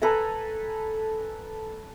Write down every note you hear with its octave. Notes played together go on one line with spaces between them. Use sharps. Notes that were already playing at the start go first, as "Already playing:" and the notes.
A4 B4 G#5 A#5